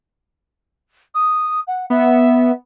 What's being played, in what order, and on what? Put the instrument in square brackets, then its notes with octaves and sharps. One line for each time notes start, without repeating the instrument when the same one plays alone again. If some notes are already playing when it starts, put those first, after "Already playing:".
[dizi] D#6
F#5
[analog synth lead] B3 [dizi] E5